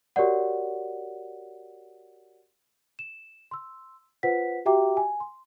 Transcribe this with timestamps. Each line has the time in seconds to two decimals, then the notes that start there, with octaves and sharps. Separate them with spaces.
0.16 F#4 G4 A#4 C#5 D5 F#5
2.99 E7
3.51 C6 E6
4.23 F4 B4 C5 F#5 B6
4.65 F#4 G4 E5 G5 A#5 D6
4.97 G#5
5.20 C6